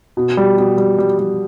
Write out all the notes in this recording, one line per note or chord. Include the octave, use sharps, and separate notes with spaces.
B2
G3
B2
G3
G3
G3